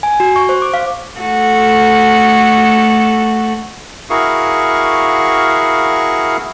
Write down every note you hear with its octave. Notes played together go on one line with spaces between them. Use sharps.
G#5
F#4
C#6
C5
D6
F5
A3 F#4 A4
E4 F#4 G#4 A#4 F5 C#6